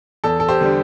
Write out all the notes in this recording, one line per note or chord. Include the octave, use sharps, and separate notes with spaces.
E2 A4
A4
G4 C5
D3 G3